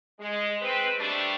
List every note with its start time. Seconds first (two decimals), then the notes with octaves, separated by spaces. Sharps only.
0.19 G#3
0.61 C4 B4
0.98 G3 A3 D4